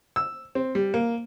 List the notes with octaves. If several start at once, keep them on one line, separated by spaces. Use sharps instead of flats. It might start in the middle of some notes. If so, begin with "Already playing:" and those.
E6
C4
G3
A#3